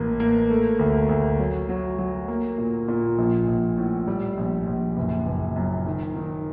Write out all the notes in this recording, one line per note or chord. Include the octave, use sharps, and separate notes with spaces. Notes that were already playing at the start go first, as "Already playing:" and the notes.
Already playing: A1 A#3
A#3
A3
D2
D2
F#3
F#3
F#3
A#3
A#2
A#2
A#1
A#1
A2
G3
A#1
A#1
F#1
F#1
F#2
D#3
D#3